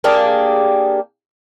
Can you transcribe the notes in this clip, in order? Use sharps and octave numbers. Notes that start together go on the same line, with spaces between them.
A#3 D4 G4 G#4